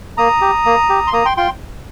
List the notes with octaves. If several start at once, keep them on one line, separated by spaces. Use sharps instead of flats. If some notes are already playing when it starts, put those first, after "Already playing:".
A#3 A#5 D#6
G4
A#3
G4
C6
A#3 A#5 D#6
G5 C6
F4 G5 C6